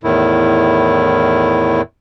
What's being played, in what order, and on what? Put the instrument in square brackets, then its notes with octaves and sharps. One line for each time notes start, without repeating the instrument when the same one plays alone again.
[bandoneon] E2 A2 D#3 E4